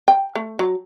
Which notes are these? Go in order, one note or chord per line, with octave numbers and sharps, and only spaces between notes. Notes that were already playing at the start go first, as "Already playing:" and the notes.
G5
A3
F#3